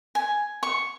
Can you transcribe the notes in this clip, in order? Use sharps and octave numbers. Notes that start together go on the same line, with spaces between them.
G#5
C#6